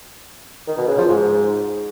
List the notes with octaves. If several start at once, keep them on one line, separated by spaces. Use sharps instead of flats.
D#3
B2
C#3
F3
G#2